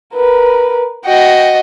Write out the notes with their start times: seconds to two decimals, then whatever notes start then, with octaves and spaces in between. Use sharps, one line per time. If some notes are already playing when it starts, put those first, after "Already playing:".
0.15 A#4 B4
1.05 F#4 D#5 G5